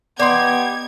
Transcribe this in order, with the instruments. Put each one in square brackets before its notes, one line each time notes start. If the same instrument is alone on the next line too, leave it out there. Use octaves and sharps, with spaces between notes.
[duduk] B3 [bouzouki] D#4 G4 [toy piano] D5 F#5 C6 [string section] G#6